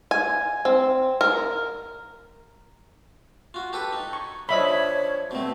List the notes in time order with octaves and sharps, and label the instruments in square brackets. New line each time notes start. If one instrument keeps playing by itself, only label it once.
[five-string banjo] G#5
C4
A#4
[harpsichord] F4 F#4
G4 A4 B4
D#4
[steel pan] C#6
[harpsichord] D3 F3 [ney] C#5 [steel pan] D#5 E5 B5
[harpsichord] B2 A3 [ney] C4